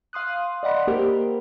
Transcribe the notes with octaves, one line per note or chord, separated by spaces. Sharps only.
F5 C6 D#6 F#6
D5 D#5 F#5 B5 C6
A#3 G4 A#4 C5